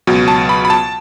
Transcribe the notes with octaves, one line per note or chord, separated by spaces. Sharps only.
C#2 B2 F#3
A5
B5
B5
A5